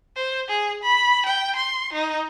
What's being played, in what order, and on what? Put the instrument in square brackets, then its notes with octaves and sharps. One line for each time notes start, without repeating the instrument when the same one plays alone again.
[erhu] C5
G#4
B5
G5
C6
D#4